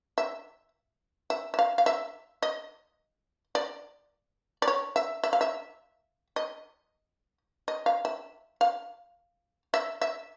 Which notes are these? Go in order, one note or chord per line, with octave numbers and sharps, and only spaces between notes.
E5
E5
E5
F5
F5
E5
D#5
D5
D5
C#5
E5
E5
F5
E5
D#5
D#5
F5
E5
F5
E5
E5